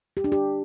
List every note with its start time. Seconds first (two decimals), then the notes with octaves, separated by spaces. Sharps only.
0.17 G4
0.24 D4
0.32 G4